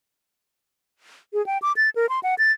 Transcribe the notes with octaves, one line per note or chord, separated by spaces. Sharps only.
G#4
G5
D6
A6
A#4
C6
F#5
A6